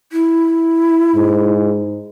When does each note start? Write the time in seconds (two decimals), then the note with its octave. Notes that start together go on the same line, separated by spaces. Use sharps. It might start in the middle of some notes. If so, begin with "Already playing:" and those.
0.12 E4
1.16 G#2